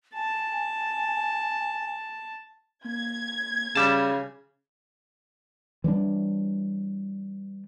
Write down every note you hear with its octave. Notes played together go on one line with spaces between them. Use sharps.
G#5 A5
A#3 G#6
C#3 G3 A5
E3 G3 G#3 D4